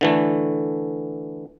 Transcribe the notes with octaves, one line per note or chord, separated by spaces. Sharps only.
D3 E3 A3